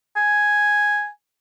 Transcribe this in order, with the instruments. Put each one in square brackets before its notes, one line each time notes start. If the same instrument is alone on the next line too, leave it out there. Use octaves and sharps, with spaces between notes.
[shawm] G#5